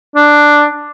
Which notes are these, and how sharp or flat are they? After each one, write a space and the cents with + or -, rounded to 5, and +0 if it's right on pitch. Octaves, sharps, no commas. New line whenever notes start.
D4 +5